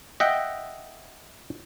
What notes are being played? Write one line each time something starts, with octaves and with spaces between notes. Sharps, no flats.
D#5 E5 F#5 G5